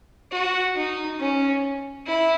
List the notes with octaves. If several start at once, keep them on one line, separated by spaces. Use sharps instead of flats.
F#4
D#4
C#4
E4